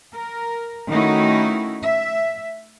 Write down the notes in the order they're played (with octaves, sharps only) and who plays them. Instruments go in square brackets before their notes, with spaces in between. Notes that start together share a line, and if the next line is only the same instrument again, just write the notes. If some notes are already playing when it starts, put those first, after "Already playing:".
[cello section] A#4
D#3 A3 C#4 D#4 E4 F#4
E5